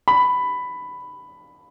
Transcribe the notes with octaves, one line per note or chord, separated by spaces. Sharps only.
B5